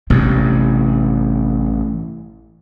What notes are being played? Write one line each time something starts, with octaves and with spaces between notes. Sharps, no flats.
A1 G2 C3 C4